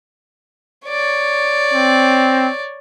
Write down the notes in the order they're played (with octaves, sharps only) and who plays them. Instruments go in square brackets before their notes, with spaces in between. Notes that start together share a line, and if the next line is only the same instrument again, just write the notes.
[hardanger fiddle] C#5 D5
[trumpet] C4